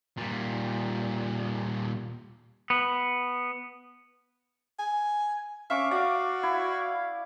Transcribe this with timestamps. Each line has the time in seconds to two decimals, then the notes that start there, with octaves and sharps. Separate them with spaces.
0.17 A#2 G3
2.70 B3
4.79 G#5
5.70 C#4 E5 F5 C#6 D6
5.91 F#4 D5 F5
6.43 E4